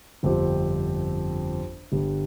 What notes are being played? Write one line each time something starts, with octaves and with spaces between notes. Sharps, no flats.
G1 F2 F3 C4 G4
G1 G2 G3